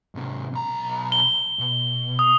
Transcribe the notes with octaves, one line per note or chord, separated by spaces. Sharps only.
G#2 C3
B1 A#5
G7
B2
D#6